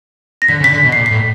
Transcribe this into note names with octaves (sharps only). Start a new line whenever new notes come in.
A#6
D3 B6
C#3
B6
D3
B2
A#2 C7
A2 B6